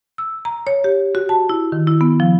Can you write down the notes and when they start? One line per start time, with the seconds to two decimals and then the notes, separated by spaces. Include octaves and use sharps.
0.18 E6
0.45 A#5
0.67 C#5
0.84 G4
1.15 F#4
1.29 A5
1.49 E4
1.72 D#3
1.87 E4
2.01 B3
2.20 F3